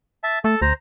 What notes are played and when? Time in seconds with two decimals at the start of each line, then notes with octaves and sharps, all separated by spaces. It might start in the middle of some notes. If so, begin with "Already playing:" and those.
0.23 E5 A5
0.44 A3 A4
0.62 D2 C5 A#5